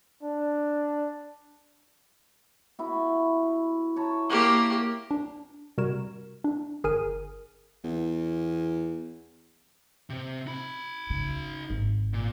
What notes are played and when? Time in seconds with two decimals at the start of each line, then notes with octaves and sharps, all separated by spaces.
0.23 D4
2.79 B3 E4 F#4
3.96 C#5 A5 A#5
4.30 A#3 G4
5.11 D4
5.78 C3 G3 F#4 A#4 G#6 E7
6.44 D4
6.84 G1 G#4 A#4 G#5 F6 D#7
7.84 E2
10.10 C3 C4
10.47 D#4 B5
11.10 C#3
11.70 G#1
12.14 A#2